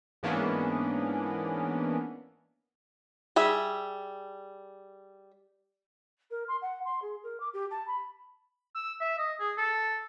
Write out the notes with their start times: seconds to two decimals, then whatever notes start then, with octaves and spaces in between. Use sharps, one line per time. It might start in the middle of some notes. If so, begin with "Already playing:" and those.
0.23 G#2 E3 A#3 B3 C#4 D4
3.36 G3 G#4 E5
6.30 A#4
6.48 C6
6.61 F#5
6.85 C6
7.02 G#4
7.23 A#4
7.40 D6
7.53 G4
7.70 A5
7.87 B5
8.75 E6
9.01 E5
9.18 D#5
9.40 G#4
9.57 A4